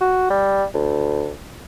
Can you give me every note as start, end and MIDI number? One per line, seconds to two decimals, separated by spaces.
0.01 0.29 66
0.30 0.65 55
0.74 1.33 38